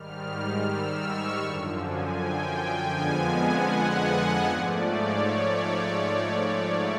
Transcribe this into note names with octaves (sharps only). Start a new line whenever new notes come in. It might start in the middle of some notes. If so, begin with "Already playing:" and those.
Already playing: G#2 D#3 G3 F6
E6
C#6
F#2 D3 F3
G#5
G5
F2 D3 F3 G#3 B3 G#5
F#5
F#5
G#2 F3 A3 D5
C#5